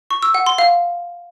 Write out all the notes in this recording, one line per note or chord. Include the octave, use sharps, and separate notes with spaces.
C#6
E6
F#5
C6
F5